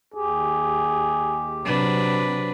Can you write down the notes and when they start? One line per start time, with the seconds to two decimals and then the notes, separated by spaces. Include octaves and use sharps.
0.14 D#2 G4 G#4
1.65 C3 F#3 D4 B4